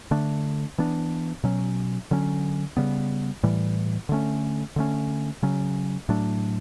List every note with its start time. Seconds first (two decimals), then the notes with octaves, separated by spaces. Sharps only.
0.11 D3 A3 D4
0.78 E3 B3 D4
1.43 B2 F#3 C#4
2.11 D3 F#3 C#4
2.77 C#3 G3 B3
3.43 A2 E3 G3
4.09 D3 A3 C#4
4.76 D3 A3 C#4
5.43 C#3 F#3 C#4
6.09 A2 F#3 A3 D4